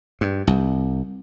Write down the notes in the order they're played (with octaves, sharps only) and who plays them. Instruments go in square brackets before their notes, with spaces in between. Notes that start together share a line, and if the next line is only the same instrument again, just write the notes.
[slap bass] G2
C2